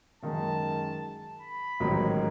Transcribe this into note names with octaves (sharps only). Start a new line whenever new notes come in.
F#2 D#3 G#3 A5
B5
A1 G#2 D#3 F#3